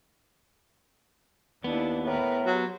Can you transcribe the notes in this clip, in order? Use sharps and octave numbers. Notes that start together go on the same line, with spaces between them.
D#2 B3 D4 E4
A2 A#4 B4
F#3 G4 C5